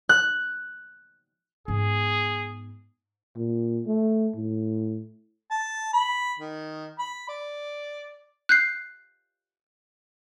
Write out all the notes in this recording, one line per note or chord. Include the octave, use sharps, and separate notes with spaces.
F#6
G#2 B3 G#4
A#2
A3
A2
A5
B5
D#3
B5
D5
F#6 G6 C7